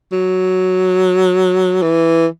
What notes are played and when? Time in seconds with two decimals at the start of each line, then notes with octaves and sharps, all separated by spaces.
0.12 F#3
1.82 E3